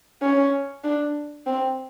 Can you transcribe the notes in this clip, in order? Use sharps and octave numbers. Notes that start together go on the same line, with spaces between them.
C#4
D4
C4